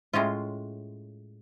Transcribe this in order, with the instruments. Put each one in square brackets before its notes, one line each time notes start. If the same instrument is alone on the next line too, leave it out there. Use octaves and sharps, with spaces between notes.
[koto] A2 G#3 C#4 F4